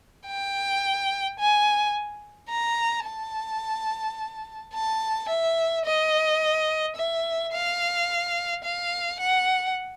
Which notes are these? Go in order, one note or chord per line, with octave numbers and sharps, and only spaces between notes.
G5
G#5
A#5
A5
A5
E5
D#5
E5
F5
F5
F#5